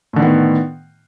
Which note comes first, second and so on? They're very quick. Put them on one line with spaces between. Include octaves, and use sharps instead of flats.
A2 D3 D#3 B3